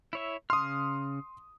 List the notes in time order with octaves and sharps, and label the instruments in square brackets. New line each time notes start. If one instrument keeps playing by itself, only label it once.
[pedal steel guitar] E4 C#5 E5
[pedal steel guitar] C#3 F6 [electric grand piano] C6 D#6